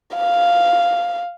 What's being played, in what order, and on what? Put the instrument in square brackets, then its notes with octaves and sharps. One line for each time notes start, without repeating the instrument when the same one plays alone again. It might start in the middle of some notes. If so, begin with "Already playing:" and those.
[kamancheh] F5